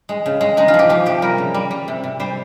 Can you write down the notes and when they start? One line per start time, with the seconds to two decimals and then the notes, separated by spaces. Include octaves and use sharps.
0.09 G#3
0.26 C#3
0.41 G#3
0.57 G#3 D#4
0.68 F4
0.74 F3
0.79 G4
0.89 F3 G4
1.06 C3 G4
1.22 G3 A#4
1.38 C#3
1.54 G3
1.71 G3
1.88 C3
2.04 C3
2.20 G3 C5